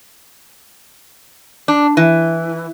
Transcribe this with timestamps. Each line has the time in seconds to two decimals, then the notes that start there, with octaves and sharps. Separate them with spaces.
1.68 D4
1.97 E3